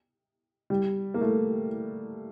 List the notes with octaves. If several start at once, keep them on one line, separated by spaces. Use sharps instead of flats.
G3
A#3
A3